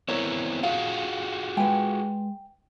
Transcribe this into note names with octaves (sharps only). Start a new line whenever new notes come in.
B3 C4 E4 A#4 C#5
F4 F#4 G#4 F5
G#3 B4 G5 G#5